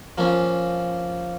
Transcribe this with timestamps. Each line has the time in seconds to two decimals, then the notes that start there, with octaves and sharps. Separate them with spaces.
0.18 F3 A#3 C#4